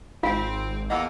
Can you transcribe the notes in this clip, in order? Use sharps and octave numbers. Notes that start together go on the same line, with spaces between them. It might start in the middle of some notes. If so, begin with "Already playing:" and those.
G#1 C4 F4 F5
E2 A#3 D#5 F#5 E6